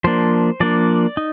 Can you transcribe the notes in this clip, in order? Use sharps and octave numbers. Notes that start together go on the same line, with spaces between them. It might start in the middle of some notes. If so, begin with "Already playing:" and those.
F3 A#3 D4 C5
F3 A#3 D4 D5
D#4